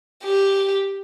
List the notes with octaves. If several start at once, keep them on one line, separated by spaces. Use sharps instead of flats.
G4